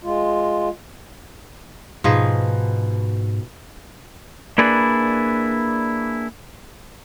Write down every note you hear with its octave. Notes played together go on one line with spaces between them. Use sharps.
G#3 F4
G#2 B2 F3 D#4 G#4
A#3 D4 E4 G#4 B4 D5